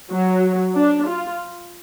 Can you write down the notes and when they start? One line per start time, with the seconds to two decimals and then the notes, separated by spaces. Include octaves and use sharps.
0.11 F#3
0.75 D4
1.09 F4